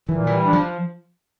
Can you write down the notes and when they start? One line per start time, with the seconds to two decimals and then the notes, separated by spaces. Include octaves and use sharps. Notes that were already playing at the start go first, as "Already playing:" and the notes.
0.09 A#2 E3
0.27 E3 G3
0.45 D4
0.53 F3